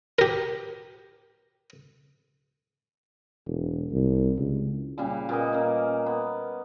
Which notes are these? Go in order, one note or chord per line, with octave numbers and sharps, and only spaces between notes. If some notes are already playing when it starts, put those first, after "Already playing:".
G4 A#4
E1
C2
C#2
A#2 C#3 G3
A#2 B3 A#4 D#5
A#3 C#4
B3